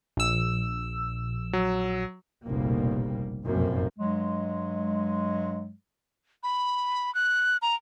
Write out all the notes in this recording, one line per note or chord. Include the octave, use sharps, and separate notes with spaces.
A#1 E6
F#3
F1 A#1 B2 G3 A#3
F1 B1 F#2 A2 A#3 C4
G2 F#3 G#3
B5
F#6
A#5